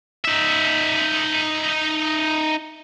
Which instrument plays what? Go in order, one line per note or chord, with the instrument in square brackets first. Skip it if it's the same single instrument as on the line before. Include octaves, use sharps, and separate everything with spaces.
[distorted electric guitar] D#4 E5